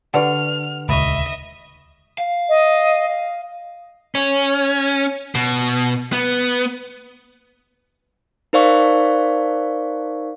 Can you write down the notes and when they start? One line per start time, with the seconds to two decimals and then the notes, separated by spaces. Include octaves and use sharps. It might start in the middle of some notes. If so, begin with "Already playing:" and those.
0.14 D3 G4 B4 F#5 F6
0.89 D#1 C#2 D#5 E5 B5 C#6
2.18 F5
2.49 D#5
4.15 C#4
5.35 B2
6.13 B3
8.53 D#4 A#4 C5 D5 F5 C#6